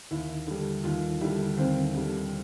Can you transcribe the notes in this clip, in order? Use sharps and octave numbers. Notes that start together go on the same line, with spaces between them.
D#2 E4
D3 G3
D#2 F4
D3 G3 E4
D#2 C4
D3 G3